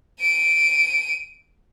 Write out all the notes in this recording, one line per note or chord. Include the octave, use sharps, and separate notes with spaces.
D7 D#7